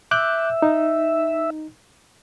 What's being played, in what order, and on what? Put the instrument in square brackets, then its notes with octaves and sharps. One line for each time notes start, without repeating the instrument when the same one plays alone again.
[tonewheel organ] E5 [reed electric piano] D6 F#6 G6
[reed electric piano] D#4